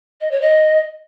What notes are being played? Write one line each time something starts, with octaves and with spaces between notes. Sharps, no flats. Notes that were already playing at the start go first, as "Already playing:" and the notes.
D#5
C#5
D#5